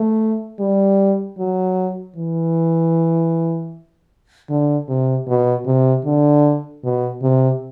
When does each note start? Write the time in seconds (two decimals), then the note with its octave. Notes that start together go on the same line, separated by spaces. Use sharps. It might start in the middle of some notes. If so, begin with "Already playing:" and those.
Already playing: A3
0.60 G3
1.38 F#3
2.16 E3
4.50 D3
4.89 C3
5.28 B2
5.67 C3
6.05 D3
6.84 B2
7.23 C3